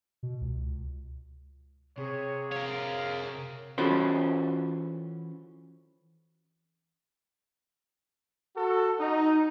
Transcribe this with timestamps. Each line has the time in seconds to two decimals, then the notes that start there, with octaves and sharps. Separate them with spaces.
0.23 B2
0.41 C#2
1.98 C3 G#4 C#5
2.52 A#4 C#5 F5
3.78 E3 C#4 F4 F#4 A4 C5
8.57 F#4 A4
9.00 D#4